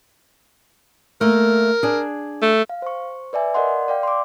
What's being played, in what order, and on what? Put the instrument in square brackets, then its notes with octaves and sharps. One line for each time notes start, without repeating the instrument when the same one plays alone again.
[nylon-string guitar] A3 A#3 [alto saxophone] A#4
[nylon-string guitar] D4 G#4
[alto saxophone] A3
[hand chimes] F5
C5 C#6
B4 D5 E5 G#5
A#4 D5 D#5 F#5 C6
D5 F5 G5
C6 D6